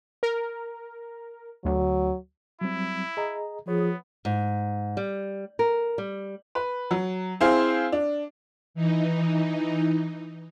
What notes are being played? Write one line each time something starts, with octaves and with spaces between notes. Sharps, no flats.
A#4
D2 F#3
F#3 G3 C4 E4
G#4 D#5 A#5
F3 B3 G#4 C#5
G#2
G3
A#4
G3
B4
F#3
C4 E4 G#4 C5 F5
D4
E3 D#4